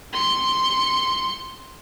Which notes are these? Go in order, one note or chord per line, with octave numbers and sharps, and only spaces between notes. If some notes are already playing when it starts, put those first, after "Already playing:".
C6 C#7